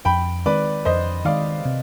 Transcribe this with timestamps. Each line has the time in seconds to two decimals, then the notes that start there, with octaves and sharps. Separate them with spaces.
0.05 F2 G5 B5
0.45 D#3 G#3 C4 B4 D5
0.85 F2 C5 D#5
1.25 D#3 G#3 C4 D5 F5
1.65 C3